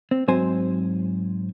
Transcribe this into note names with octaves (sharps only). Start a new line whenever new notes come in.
C4
G#2 F#3 C4 C5 G#5